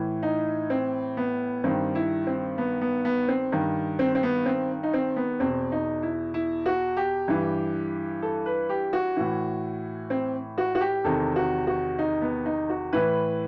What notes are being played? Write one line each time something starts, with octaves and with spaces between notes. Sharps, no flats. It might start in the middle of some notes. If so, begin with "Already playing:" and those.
Already playing: A2 E3
D#4
C4
B3
G2 D#3 C4
E4
C4
B3
B3
B3
C4
G2 D#3
C4
C4
B3
C4
D#4
C4
B3
E2 B2 C4
D#4
E4
E4
F#4
G4
G2 E3
A4
B4
G4
F#4
A2 E3
C4
F#4
F#4
G4
E2 C3 D#3 A4
F#4
F#4
D#4
B3
D#4
F#4
A2 E3 B4